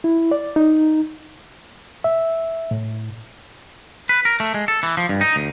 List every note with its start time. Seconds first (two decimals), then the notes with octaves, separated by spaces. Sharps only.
0.04 E4
0.31 D5
0.56 D#4
2.04 E5
2.71 A2
4.09 B4
4.25 A#4
4.40 A3
4.54 G#3
4.68 A4
4.83 E3
4.97 F3
5.09 G2
5.21 D#4
5.36 D2